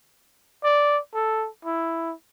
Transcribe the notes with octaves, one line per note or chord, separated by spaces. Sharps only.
D5
A4
E4